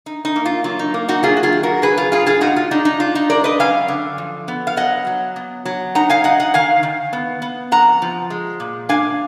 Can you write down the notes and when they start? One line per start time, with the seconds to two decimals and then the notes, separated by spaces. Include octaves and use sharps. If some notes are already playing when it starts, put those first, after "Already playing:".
0.06 D#4
0.25 D#4
0.36 A#3
0.45 F4
0.64 F#3 F4
0.79 D#4
0.94 A#3
1.08 D#4 F#4
1.23 F#3 F4 G#4
1.37 F#4
1.43 F4 G#4
1.52 D#3
1.63 F#4 A#4
1.82 F#3 G#4 B4
1.97 F4 G#4
2.12 G#2 F4 G#4
2.26 F4 G#4
2.41 G#3 D#4 F#4
2.56 F4
2.71 D4 D#4
2.85 D#4
3.00 D4 F4
3.15 D#4
3.30 G#3 A#4 D5
3.44 B4 D#5
3.60 F#2 F5 G#5
3.88 D3
4.18 F3
4.48 B3
4.67 F5
4.76 F#3 D#5 F#5
5.07 F#3
5.36 B3
5.65 F#3
5.95 D#4 F#5 A#5
6.09 F5 G#5
6.24 D#4 D#5 F#5
6.40 D#5 F#5
6.54 D#3 F5 G#5
6.83 D#3
7.13 B3
7.42 B3
7.72 F2 F#5 A#5
8.02 F3
8.30 G#3
8.60 A#2
8.89 D4 F5 G#5